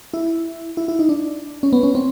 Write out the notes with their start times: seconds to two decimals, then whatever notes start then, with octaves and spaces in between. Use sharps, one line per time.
0.14 E4
0.77 E4
0.88 E4
0.99 D#4
1.09 D4
1.63 C#4
1.73 B3
1.83 C#4
1.95 C4